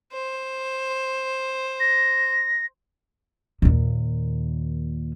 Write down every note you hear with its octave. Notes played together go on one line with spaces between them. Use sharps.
C5
A#6
D#2 A#2